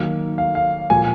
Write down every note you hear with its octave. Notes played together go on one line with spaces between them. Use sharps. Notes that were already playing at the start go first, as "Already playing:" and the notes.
Already playing: D#3 F#3 A#3
F5
F5
A#2 F3 A#3 G#5